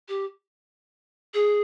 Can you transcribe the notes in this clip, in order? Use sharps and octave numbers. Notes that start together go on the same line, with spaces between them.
G4
G#4